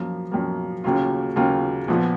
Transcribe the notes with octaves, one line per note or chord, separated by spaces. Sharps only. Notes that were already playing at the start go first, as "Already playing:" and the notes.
Already playing: F#2 F3 A#3
F#2 F3 A#3
D#2 C#3 F#3 A#3 F4
D#2 C#3 F#3 A#3 F4
A#1 A#2 F3 B3